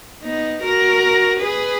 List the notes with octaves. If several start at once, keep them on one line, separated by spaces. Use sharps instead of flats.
B3 D#4
F#4 A#4
G#4 B4